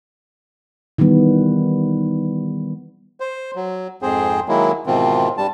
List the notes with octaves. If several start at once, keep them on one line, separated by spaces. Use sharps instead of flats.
D#3 E3 G3 B3
C5
F#3
F2 G#2 C4 G#4 C5
D#3 F#3 G#3 A#3 E4
G#2 B2 D#3 E3 C4 F4
G2 G3 A5